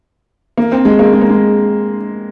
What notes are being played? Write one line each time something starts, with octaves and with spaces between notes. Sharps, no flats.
A#3
C4
G#3
A#3
G#3
A#3
G#3